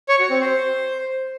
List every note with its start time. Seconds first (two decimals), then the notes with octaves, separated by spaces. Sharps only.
0.09 C#5
0.19 F#4
0.30 C4
0.41 C5